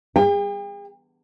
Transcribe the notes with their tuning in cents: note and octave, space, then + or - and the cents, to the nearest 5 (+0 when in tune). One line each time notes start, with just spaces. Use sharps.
G#4 -35 G5 +40